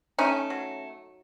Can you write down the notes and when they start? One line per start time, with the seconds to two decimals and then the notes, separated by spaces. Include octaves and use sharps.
0.19 A3 C#4 D#4
0.50 F#3